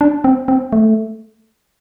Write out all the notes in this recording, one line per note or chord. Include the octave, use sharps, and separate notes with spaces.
D4
C4
C4
A3